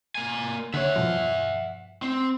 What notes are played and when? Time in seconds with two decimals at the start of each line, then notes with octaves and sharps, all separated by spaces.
0.15 A#3 G#5
0.74 D3 C#5 E5 F#5
0.96 G2 B2 F3
2.02 C4